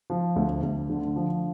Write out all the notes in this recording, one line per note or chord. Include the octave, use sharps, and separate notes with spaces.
F3
D2
D2
D3
F3